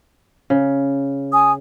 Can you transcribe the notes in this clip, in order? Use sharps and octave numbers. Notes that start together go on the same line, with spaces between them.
C#3
G#5 D#6